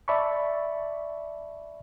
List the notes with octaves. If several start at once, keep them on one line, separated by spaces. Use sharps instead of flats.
D5 E5 A5 B5 C#6